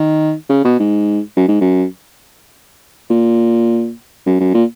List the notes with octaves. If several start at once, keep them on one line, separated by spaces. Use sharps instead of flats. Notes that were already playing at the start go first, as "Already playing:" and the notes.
Already playing: D#3
C#3
B2
G#2
F#2
G#2
F#2
A#2
F#2
F#2
A#2